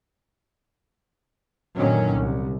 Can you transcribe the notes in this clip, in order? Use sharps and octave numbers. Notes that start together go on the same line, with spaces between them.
F#2 A#2 D3 D#3 F#3 C#4
C2